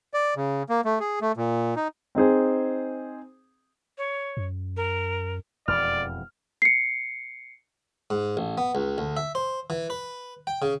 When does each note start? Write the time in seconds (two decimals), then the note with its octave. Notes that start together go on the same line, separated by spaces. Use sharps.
0.14 D5
0.36 C#3
0.69 A#3
0.85 A3
1.00 G#4
1.21 A3
1.37 A#2
1.76 D#4
2.15 C4 D#4 G#4 C5
3.98 C#5
4.37 F#2
4.77 A#4
5.68 E1 F2 E3 D5 F6
6.62 C7 C#7
8.10 G#2
8.37 A1
8.58 B3
8.75 C#2
8.98 D2
9.17 E5
9.35 C5
9.70 E3
9.90 B4
10.47 G5
10.62 C#3